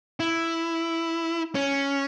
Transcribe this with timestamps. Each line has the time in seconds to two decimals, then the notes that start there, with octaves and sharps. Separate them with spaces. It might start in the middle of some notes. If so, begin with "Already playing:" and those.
0.20 E4
1.55 C#4